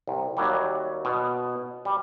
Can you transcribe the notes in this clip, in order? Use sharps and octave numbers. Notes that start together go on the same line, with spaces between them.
C2
D#2 F#3 G3
B2
G3